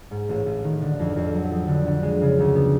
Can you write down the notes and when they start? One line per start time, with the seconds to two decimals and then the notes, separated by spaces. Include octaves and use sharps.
0.11 G#2
0.29 A1
0.46 A1
0.64 D#3
0.82 D3
0.99 F2
1.16 F2
1.34 F#3
1.51 F3
1.68 D3
1.87 D3
2.03 G#3
2.21 C#3
2.39 D2
2.55 B3